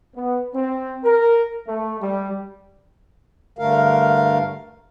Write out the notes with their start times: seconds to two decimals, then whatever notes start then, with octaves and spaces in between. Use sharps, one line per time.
0.15 B3
0.54 C4
1.03 A#4
1.66 A3
2.00 G3
3.59 G2 D3 A3 A#4 F5